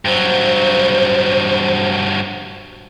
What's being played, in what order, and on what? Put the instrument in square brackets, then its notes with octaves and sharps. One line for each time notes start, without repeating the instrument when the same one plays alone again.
[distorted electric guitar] G2 F#3 [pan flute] C5